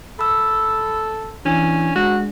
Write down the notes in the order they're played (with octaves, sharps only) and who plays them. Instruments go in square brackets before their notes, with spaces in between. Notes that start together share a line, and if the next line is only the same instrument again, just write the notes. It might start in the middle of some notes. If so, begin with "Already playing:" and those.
[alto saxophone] A4 [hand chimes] B5 E6
[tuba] E3 [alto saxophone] C#4 [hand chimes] D4
[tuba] G#3 [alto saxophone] F#4